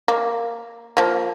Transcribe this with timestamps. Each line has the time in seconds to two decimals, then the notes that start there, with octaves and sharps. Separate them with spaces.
0.08 A#3
0.97 F3 A#3